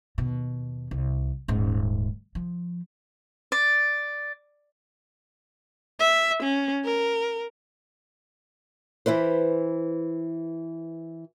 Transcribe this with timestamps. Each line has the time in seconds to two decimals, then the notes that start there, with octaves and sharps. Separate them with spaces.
0.18 D#2 B2
0.91 C2
1.48 D#1 G#2
2.35 F3
3.52 D5
6.00 E5
6.43 C#4
6.85 A#4
9.06 E3 E4 B4 C5